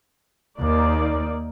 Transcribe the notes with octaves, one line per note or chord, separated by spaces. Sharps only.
D#2 A#3 D#4 D5